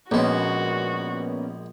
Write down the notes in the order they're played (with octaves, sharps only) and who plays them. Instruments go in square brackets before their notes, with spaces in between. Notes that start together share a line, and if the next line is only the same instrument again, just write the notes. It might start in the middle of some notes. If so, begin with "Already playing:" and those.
[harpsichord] A#1 G#3 [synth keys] A#3 B3 C#4 [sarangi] F#4